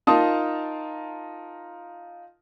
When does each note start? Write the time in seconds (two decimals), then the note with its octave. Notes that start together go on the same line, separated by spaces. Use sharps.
0.07 D#4 F4 A#4 A5 C6 D#6